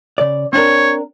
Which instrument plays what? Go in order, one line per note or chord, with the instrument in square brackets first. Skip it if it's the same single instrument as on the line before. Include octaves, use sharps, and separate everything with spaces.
[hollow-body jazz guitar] C#3 D5
[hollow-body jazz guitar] C4 D4 A#4 [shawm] C#5